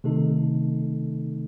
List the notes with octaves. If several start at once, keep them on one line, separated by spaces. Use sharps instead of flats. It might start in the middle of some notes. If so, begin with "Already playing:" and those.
C3 D#3 A3 D#4 A4